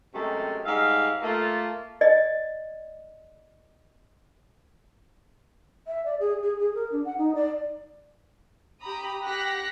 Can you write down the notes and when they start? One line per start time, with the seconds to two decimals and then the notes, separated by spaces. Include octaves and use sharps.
0.15 F#2 C3 G#3 A3 A4 G5
0.66 G#2 G3 E5 F5
1.22 A3 A#3 F4
2.01 D5 D#5
5.87 E5
6.05 D5
6.20 G#4
6.43 G#4
6.59 G#4
6.75 A#4
6.92 D4
7.05 F#5
7.18 D#4
7.35 D5
8.81 G4 A#5 B5 D#6
9.23 G4 F#5 F#6 A#6 B6